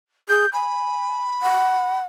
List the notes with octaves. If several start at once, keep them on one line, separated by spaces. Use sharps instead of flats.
G#4 G6
G#5 B5
F#5